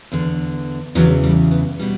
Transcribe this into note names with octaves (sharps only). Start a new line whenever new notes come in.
E2 D3
E2 C#3 E3 F#3
G3
B3
B2 G3